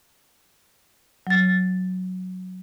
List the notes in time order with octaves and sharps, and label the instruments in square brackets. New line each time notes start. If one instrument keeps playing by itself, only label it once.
[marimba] F#3 A6